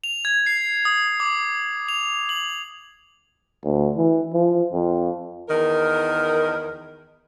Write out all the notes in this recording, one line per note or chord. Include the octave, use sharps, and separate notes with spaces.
F7
G#6
C7
D#6
D6
F7
F#7
D2
E3
F3
F2
E2 D#3 A#4